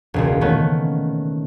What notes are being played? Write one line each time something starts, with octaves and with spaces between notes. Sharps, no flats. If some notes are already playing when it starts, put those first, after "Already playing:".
E1 C#2 A#2
D#3 A3 B3 C#4